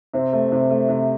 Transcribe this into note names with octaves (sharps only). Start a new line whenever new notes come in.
C3 C4
A3
C3
A3
C3